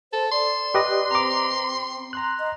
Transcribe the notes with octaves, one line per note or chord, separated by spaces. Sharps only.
A4 C5
D5 C6
G4 B4 D#5
C4 A#5 D6
A#5 C6 F#6
D#5